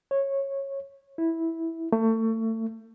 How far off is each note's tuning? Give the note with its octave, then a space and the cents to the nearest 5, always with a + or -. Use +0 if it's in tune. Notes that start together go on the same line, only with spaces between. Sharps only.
C#5 -15
E4 -10
A3 +30